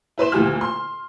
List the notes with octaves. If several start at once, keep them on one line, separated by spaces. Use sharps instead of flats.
E4 B4 C6 E7
D2 A#2 G4 G#5 F6
C6